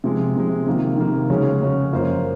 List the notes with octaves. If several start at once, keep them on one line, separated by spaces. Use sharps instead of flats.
C3 F3 G#3
C3 F3 G#3
C3 D#3 A#3
C3 D#3 A#3
C#3 G#3 C#4 F#4
C#3 G#3 C#4 F#4
F#2 F3 A#3 F4 C5